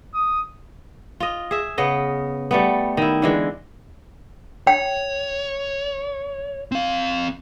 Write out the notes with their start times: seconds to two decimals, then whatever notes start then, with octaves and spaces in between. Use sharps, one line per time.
0.14 D#6
1.20 F4 D#5
1.51 G#4 E5
1.78 C#3 B3 D#5
2.51 G3 A3 B3
2.97 D#3 E4
3.22 D3 E3 G#3
4.67 C#5 G5
6.72 C4 F5